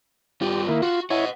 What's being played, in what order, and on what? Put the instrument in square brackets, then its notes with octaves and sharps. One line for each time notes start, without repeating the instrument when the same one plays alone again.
[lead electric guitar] G2 F4 [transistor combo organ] G4
[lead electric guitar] D#3 [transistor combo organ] A#3 E4
[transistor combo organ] F4 [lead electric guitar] F#4
[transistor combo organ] E4 C#5 [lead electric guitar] D#5 F#5